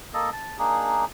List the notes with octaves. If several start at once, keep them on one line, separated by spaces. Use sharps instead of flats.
A#3 A4 D#5
A5
A#3 D4 D#4 G#4